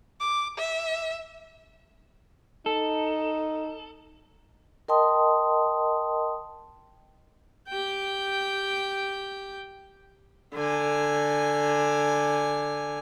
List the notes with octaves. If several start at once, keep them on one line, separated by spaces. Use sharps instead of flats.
D6
E5
D#4 A4
A#4 D#5 G5 A5 C6 D#6
G4 G5
D3 G#5